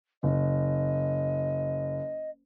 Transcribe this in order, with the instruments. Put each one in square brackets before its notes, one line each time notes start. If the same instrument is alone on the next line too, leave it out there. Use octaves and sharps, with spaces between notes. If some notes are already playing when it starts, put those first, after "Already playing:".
[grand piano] F#1 [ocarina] D#5